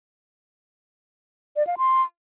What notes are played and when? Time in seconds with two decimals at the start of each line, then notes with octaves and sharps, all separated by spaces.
1.56 D5
1.67 F5
1.78 C6